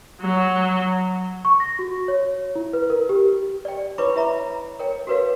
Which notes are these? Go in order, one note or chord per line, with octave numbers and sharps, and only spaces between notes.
F#3
C#6
A#6
F#4
C#5
E4
B4
A#4
G4
D5 G5
E4 B4 C#5 B5 C#6 D6
E4 E5 A#5 B5
A#4 C#5 G5
F#4 A#4 B4 C#5 F5